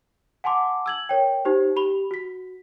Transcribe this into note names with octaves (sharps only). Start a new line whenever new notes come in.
F#5 G#5 A5 C6 D6
E6 G#6 F#7
A#4 C#5 G5
D#4 G4 C5
G4 B5 F7 G7
F#4 B6